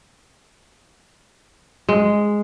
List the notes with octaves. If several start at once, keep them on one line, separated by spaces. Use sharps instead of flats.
G#3